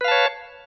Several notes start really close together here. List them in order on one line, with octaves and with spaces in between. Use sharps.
B4 F5 A5 C#5